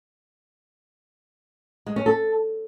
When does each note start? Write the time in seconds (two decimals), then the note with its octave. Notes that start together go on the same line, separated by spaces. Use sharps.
1.86 G#3
1.96 C#4
2.06 A4